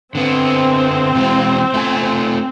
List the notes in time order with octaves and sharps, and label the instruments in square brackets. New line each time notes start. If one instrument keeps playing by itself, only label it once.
[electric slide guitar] D3 B3 [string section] C4
[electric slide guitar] B2 E3 G#3
A3 F4 G#5